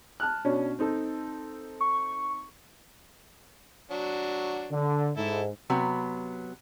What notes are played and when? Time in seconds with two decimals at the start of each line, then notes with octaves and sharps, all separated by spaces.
0.20 A5 F6 F#6
0.44 B2 C#4 D4
0.79 C4 D#4 A4
1.81 C#6
3.91 F#3 D4 F#4
4.72 D3
5.17 G#2 E4 A4
5.70 C3 F#3 B3